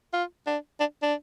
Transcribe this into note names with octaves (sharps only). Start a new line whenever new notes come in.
F4
D4
D4
D4